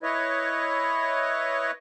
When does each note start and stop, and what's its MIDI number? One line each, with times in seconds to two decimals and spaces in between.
0.03 1.71 64
0.03 1.71 71
0.03 1.71 73
0.03 1.71 75